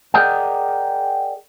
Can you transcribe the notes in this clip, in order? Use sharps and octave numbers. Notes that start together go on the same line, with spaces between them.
G#4 A#4 D5 D#5 F#5 G5